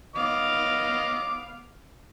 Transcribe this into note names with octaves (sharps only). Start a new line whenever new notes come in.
B3 D#5 F5 D6